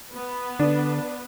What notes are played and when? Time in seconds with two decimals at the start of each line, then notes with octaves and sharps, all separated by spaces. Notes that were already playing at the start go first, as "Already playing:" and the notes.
0.11 B3 B4
0.59 D3 D4